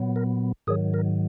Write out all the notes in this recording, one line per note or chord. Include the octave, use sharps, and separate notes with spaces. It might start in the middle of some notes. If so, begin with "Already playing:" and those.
Already playing: A#2 F#3 B3
A#4
G#2 D#3 F#3 G#4
A#4